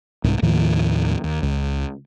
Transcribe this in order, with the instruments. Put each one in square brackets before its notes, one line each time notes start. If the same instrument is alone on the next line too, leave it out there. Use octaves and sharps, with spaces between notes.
[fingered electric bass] C2 G#2
D#2 A2 D#3 F3
D#2
C#2